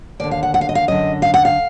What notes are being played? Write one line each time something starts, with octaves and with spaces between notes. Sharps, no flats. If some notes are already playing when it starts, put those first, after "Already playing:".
D#2 D3 D5
F5
F#5
F#5
F5
D#5
F5
F#2 D3 D#5
F5
F#5
F5